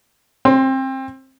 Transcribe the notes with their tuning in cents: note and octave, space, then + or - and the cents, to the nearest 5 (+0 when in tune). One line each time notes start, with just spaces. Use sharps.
C4 +25 C6 +0